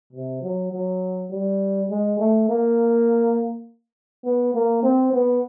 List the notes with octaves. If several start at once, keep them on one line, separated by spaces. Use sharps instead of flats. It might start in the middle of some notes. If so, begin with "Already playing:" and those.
C3
F#3
F#3
G3
G#3
A3
A#3
B3
A#3
C4
B3